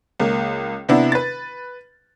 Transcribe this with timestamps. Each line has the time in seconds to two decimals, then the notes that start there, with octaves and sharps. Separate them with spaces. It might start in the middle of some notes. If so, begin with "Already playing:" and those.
0.20 C#2 A#3
0.89 C3 B3 D4 E4
1.12 B4 A6